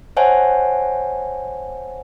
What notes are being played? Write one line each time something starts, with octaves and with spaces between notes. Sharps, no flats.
C5 C#5 E5 F#5 G#5 A5